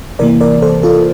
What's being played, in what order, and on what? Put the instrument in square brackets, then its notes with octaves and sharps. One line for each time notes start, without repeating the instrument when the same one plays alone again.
[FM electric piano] C3 E3 A#3 A#4 D5
A#4 D5
A4 C5
F4 A4